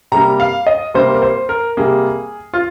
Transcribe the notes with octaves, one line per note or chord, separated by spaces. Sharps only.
C3 G3 A#3 A#5
F5
D#5
C3 G3 A#3 C5
A#4
C5
A#4
C3 G3 A#3 G#4
F4